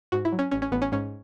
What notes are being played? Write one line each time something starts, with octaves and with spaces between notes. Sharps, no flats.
G#2 F#4
E4
F#3
C#4
A1 C#4
C#4
A1 B3
C#4
G#2 C#4